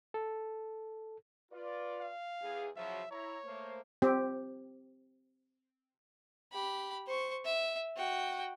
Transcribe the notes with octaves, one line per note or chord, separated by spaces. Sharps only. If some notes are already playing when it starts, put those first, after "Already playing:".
A4
F4 B4 D5
F5
E2 G#4
C#3 F3 F#3 E5
E4 C#5 A#5
A3 A#3 C5
C4 G4
G4 B5
C5 C#6
E5
F#4 G5